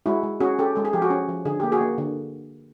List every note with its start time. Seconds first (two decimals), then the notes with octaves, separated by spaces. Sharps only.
0.06 G#3 E4 F#4
0.23 G#3
0.41 C#4 F#4 G#4
0.58 C#4 G4 A4
0.75 G#3 A4
0.85 G#4
0.93 F3 G4
1.02 F#4 G#4
1.10 C#4
1.29 F3
1.45 D3 G#4
1.60 A#3 G4
1.72 F#4 G#4
1.81 A#3
1.98 D3